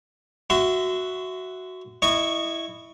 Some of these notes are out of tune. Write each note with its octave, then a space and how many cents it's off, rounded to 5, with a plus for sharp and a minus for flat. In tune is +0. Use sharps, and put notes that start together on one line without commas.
F#4 +0 E5 +0 C6 -30
E4 +0 D#5 -25 C#6 +0